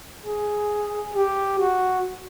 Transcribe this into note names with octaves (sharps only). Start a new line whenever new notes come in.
G#4
G4
F#4